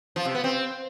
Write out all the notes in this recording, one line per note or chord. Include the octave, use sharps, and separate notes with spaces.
F3
C3
B3
C4